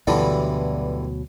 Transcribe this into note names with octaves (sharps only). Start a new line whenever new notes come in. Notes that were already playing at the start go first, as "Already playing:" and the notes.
D2 G2 B2 D3 E3 F#3